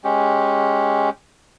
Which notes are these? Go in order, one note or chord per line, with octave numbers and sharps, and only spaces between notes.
G#3 C#4 G4